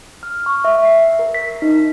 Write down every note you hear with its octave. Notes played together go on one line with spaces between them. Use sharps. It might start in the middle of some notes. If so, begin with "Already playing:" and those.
F6
C#6
E5
C7
A#4
B6
D#4